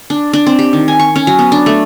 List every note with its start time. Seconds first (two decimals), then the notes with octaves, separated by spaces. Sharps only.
0.10 D4
0.33 D4
0.46 C4
0.59 G4
0.73 D#3
0.88 G#5
0.99 C#6
1.16 C#4
1.27 F#3
1.39 B3
1.52 D4
1.66 A3